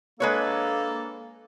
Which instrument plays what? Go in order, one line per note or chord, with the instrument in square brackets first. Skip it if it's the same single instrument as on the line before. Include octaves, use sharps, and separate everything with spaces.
[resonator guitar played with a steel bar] G#3 B4 C#5 [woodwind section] A#3 D4 A4